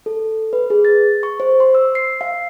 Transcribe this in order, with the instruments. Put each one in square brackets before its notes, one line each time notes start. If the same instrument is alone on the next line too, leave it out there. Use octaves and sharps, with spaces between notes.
[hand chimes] A4
B4
G#4
A6
C#6
C5
C6
E6
C7
F5